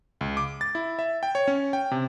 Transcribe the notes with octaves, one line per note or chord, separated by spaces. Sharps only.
C#2
D6
A6
E4
E5
G5
C#5
C#4
G5
C3